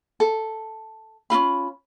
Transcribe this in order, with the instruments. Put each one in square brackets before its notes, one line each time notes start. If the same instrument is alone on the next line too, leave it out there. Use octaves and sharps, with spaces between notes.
[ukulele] A4
C#4 D#4 F4 B5